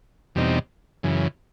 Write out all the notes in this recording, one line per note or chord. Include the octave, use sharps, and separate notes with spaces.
E2 B2 G3 C4 D#4
F#2 C#3 E3